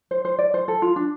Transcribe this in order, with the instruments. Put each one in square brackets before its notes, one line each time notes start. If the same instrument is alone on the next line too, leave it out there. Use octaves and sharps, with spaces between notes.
[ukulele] C5
C5
D5
C5
A4
F4
D4